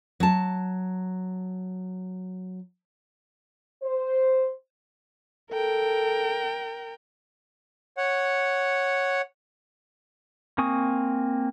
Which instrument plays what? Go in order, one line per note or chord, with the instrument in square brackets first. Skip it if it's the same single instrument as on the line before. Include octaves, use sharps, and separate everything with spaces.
[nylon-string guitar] F#3 A5
[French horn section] C5
[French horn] A4 [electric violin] A#4 G5
[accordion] C#5 F#5
[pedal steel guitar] A#3 C4 G#5 C#6 D#6